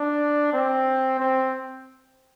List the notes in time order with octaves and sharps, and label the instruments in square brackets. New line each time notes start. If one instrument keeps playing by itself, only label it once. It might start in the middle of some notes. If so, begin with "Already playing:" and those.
Already playing: [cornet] D4
C4
C4